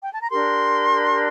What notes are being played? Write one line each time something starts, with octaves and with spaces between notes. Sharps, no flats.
G5
A5
A#5
D4 G4 A#4 C6